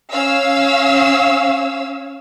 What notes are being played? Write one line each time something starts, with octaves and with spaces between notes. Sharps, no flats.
C#4 F5 E6